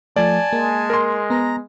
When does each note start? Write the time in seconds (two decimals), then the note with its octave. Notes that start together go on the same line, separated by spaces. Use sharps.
0.16 F3 A3 D5 G#5 A5
0.53 G#3 A#3
0.90 A#4 C6
1.30 B3 A#5